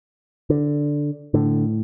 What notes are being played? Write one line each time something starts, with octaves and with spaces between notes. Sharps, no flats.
D3
A2 D3